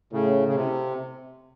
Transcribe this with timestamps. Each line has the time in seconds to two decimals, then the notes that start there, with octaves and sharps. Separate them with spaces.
0.13 A2 C#3
0.48 C#3
0.55 C3